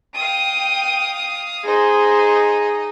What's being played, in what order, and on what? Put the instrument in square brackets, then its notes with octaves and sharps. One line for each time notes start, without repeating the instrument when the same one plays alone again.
[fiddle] F5 D#6 [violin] G5 D#7
[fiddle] D#4 D#5 [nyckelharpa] G#4 [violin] C5